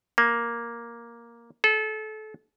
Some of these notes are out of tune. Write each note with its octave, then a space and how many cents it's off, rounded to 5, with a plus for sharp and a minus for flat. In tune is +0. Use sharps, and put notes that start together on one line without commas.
A#3 +5
A4 -30